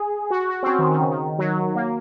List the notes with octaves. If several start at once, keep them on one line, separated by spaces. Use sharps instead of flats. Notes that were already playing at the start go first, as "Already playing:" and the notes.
Already playing: G#4
F#4
F#4
C4
C#4
D#3
D#3
C#3
D#3
F#3
A#3